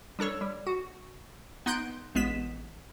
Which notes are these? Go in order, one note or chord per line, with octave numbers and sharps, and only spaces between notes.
G3 D4 A4 C#5
G3
F#4
B3 D#4 C6 F#6 G6 D7
A1 G#3 B3 B6 E7